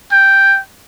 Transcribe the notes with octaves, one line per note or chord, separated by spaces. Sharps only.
G5